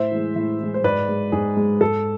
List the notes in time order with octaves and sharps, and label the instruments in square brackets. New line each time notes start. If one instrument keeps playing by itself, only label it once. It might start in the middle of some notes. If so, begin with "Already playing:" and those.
Already playing: [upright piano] A2 C5 E5
E3 G#3
A2
E3 G#3
C5
G#2 B4 D5
G#3
G#2 G#4
G#3
G#2 A4